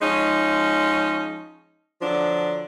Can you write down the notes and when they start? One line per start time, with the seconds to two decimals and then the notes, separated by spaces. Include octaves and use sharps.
0.02 F3 G#3 C#4 D#4
2.02 D3 F3 F#3 D4